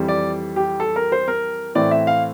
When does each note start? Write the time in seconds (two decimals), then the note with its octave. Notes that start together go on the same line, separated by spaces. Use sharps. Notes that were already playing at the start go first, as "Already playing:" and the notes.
Already playing: F2 E3 G3
0.08 D5
0.56 G4
0.80 A4
0.96 A#4
1.12 C5
1.28 A#4
1.75 A2 E3 A3 C4 E4 D5
1.91 E5
2.07 F5